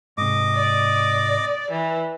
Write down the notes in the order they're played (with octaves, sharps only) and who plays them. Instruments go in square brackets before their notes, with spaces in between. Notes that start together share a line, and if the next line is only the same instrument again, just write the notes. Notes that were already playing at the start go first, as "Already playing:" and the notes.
[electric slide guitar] G#2 C3 [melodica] D#5 D6
[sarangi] D5
E3